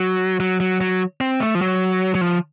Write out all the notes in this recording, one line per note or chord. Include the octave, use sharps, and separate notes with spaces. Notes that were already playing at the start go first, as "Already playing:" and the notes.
Already playing: F#3
F#3
F#3
F#3
C4
A3
F3
F#3
F#3
F3